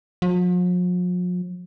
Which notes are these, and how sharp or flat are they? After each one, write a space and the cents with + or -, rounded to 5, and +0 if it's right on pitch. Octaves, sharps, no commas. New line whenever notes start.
F3 +45